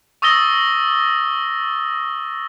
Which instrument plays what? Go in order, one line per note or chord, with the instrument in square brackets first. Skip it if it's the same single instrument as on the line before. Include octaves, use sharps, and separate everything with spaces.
[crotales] C#6 D#6 E6 A6 A#6 G7